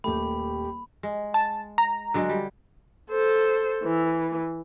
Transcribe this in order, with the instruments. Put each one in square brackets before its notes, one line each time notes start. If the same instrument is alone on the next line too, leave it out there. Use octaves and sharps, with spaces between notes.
[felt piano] D#1 A3 [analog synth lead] G4 [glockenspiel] B5
[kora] G#3
[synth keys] A5
A#5
[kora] D3 F#3 G#3
G3
[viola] A4 C5
E3